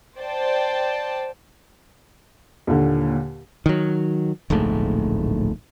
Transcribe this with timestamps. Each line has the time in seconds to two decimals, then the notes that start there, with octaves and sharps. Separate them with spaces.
0.19 C5 D5 G5 A5
2.67 D#2 A#2 D3
3.66 D#3 F#3
4.50 D1 A#1 G#2 A3